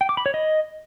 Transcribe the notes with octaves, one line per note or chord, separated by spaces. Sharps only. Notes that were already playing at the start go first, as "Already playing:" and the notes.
G5
D6
B5
C#5
D#5